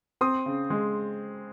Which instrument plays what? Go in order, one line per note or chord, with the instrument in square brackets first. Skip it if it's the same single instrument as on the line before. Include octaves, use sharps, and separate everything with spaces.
[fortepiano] C4 [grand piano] C6 D#6
[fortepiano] C#3
G#3